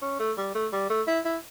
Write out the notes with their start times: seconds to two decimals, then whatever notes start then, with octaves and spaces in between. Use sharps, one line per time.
0.02 C#4
0.20 A3
0.38 G3
0.55 A3
0.72 G3
0.90 A3
1.07 E4
1.25 E4